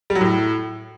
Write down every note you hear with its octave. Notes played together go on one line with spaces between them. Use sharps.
G3
F#3
A2